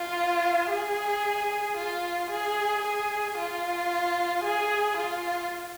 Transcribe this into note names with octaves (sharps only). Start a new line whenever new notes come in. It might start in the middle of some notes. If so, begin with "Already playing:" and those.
Already playing: F4
G#4
F4
G#4
G#4
F4
G#4
F4